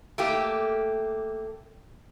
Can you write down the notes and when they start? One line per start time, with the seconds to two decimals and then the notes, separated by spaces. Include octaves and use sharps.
0.18 A3 A#3 G4